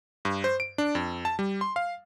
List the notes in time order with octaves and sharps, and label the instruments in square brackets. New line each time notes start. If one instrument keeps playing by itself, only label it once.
[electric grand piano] G2
C5
D7
D4
F2
A5
G3
C6
F5